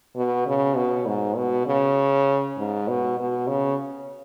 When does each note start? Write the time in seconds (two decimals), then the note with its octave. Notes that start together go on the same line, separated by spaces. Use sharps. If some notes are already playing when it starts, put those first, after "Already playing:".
0.16 B2
0.46 C#3
0.76 B2
1.06 G#2
1.36 B2
1.67 C#3
2.57 G#2
2.88 B2
3.18 B2
3.47 C#3